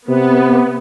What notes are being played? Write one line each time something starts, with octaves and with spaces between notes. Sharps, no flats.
C3 B3